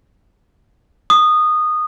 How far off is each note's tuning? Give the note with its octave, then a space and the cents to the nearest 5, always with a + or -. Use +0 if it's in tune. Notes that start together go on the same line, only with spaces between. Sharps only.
D#6 -15